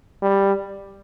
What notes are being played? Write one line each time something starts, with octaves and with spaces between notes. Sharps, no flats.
G3